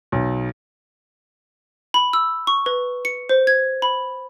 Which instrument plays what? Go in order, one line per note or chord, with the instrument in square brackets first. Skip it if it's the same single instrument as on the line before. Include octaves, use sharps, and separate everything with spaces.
[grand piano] B1
[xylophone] B5
E6
C#6
B4
C#7
C5
G#6
B5